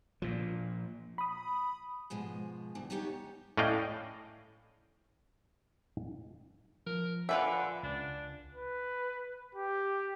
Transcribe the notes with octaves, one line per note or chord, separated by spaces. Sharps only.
A#2 F3
B5 D#6
G#2 B2 F3 G#3
D2 G2 E3 D4
C#3 G3 B3 D#4 G4 C#5
A2 C#4 D5 D#5 F5 G5
F3 A#4
D3 F4 B4 E5 F#5 G#5
C#2 D4
B4
G4